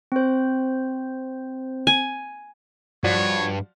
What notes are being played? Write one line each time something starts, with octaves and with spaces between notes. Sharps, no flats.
C4 C5
G#5
G2 F3 F#4 C#5 D5